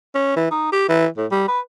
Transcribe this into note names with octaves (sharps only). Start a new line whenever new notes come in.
C#4
E3
D#4
G4
E3
A2
G3
B4